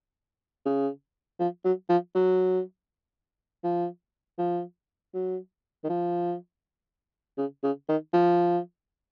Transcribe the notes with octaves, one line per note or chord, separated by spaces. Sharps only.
C#3
F3
F#3
F3
F#3
F3
F3
F#3
D#3
F3
C#3
C#3
D#3
F3